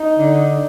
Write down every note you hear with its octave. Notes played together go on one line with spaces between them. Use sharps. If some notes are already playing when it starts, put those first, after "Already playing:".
Already playing: D#4
D3